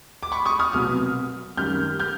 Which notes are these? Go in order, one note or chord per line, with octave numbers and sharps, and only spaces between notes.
D6
B5 C#6
C#6 D#6
D#6 F6
C2 B2 F#3 D#6 F6
F#2 D#3 G3 F6 G6
F6 G6